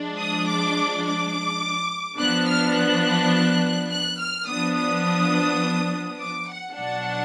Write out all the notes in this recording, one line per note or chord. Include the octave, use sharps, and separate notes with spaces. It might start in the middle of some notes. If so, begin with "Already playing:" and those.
Already playing: F3 G#3 D4
D#6
D6
D6
F3 B3 D4 F#6
F6
F#6
F#6
F6
F3 B3 D4 D#6
D#6
D6
F#5
B2 F#3 D4 F#5